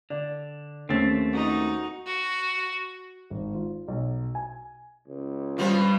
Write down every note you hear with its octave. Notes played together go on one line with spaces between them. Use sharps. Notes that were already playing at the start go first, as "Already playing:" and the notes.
D3 D5
D#2 A3 C4 C#4 A6
D#4 F#4
F#4
G#1
F4
B1
G#5
C#2
G2 B2 F3 B3